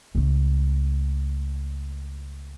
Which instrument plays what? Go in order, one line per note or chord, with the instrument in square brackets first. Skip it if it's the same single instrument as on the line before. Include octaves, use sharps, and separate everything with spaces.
[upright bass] C#2 A3